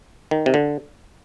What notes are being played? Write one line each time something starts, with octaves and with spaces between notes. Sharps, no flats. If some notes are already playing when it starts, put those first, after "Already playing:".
D#3
C3
D3